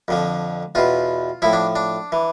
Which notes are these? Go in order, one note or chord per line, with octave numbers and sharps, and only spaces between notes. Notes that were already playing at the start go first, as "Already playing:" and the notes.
F2 D3 F3
E2 B2 F4
A2 F3 E4
D4
D4
E3